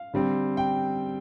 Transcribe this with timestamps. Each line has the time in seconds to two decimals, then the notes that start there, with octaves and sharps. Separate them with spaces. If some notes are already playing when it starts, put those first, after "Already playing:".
Already playing: F5
0.14 D3 G3 C4
0.57 G5